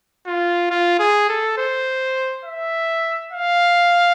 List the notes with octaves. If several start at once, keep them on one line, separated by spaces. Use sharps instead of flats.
F4
F4
G#4
A4
C5
E5
F5